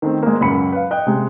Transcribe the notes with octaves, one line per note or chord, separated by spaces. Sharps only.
D#3 A3 C4
G#3 A#3
C#2 F#2 B5 C#7
B4 F5
D#5 G5 F#6
C3 G#3